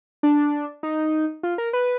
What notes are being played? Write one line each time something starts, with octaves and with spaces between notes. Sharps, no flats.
D4
D#4
F4
A#4
B4